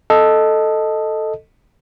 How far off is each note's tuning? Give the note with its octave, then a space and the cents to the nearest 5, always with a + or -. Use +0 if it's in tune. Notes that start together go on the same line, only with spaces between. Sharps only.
A4 +0 D#5 +0